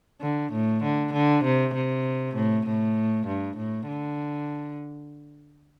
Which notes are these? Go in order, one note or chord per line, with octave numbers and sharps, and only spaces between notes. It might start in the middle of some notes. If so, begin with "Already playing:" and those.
D3
A2
D3
D3
C3
C3
A2
A2
G2
A2
D3